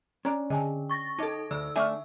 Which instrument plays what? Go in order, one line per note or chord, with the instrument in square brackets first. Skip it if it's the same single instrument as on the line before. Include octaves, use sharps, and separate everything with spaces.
[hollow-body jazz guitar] C#4 D4 [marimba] A#5
[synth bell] D3 [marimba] D#5 G#5 A5
[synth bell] C#6 A6 A#6
[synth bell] D#4 A4 [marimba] D#5 A5
[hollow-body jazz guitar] D2 [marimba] D3 [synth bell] E6
[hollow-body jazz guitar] A3 D4 G#5 [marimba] E5 C#6 F6